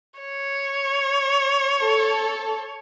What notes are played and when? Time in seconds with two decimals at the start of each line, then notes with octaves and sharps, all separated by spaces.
0.20 C#5
1.81 A4